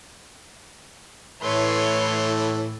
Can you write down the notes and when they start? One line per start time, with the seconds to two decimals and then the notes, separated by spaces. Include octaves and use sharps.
1.42 A2 E3 A3 B4 C#5 C6